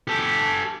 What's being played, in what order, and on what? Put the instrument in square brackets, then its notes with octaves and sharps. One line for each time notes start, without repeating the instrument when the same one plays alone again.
[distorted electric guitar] G4 A4